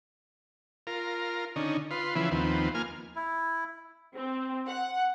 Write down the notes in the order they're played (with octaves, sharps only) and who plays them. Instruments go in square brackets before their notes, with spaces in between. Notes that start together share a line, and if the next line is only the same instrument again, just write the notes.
[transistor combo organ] F4 A#4
D3 C#4 D#4
F4 B4 C6
C#3 E3 F3 B3 E4
D#2 F3 B3 C4
A#3 F4 G#5 F6
[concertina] E4
[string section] C4
F#5